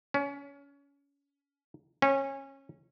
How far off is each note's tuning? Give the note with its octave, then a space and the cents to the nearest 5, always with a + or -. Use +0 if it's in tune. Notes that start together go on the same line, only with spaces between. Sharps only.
C#4 +25
C#4 -25